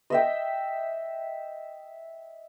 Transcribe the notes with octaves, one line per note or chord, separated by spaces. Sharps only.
D#5 E5 G5